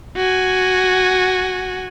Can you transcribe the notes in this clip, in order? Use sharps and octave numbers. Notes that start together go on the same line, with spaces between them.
F#4 G#5